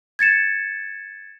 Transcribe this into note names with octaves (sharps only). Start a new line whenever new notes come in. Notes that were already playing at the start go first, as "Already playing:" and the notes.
G#6 A6 C#7 E7